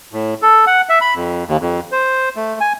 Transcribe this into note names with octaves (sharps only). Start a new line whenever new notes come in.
A2
A4
F#5
E5
B5
F2
D#2
F2
C5
A3
G#5